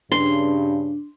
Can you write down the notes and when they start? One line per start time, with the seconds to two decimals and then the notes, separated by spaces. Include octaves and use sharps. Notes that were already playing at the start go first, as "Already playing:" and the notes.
0.12 G2 C#3 D4 C6